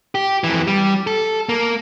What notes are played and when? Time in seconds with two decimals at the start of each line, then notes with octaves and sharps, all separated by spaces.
0.15 G4
0.44 F2 E3
0.67 G3
1.07 A4
1.49 A#3